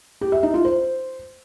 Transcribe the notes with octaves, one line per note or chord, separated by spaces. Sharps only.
G4
E5
D#4
F4
C5